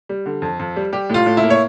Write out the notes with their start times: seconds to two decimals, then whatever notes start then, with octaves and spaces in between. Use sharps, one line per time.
0.09 G3
0.26 D3
0.42 F2
0.59 F2
0.76 G3
0.92 G3 G4
1.10 A2 F4
1.26 A2
1.37 E4
1.43 A#3
1.50 C#5